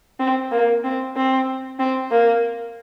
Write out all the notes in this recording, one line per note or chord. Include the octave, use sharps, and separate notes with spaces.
C4
A#3
C4
C4
C4
A#3